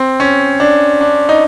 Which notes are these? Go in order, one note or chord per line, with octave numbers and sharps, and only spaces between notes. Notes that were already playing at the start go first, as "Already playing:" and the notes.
Already playing: C4
C#4
D4
D4
D#4